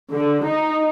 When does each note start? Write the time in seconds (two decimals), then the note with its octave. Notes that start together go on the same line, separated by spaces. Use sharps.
0.11 D3
0.44 D#4